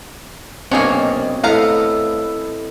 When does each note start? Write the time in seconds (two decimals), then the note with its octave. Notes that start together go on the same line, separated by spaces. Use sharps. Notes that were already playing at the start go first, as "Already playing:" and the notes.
0.71 F#2 B2 A#3 C4 D4 G#4 C#5 D#5
1.44 A2 B3 E4 A4 D#5 F5 A#5